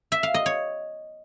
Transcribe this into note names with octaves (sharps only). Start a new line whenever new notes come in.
E5
F5
D#5
C#5